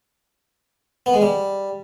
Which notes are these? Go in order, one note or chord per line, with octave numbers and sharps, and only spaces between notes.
B3
G#3
G3